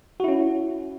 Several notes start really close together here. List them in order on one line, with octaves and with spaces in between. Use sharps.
F#4 E4 C#4